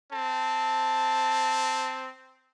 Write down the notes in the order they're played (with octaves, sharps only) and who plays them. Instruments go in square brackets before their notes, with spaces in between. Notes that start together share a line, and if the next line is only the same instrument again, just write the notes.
[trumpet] C4 [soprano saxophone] A5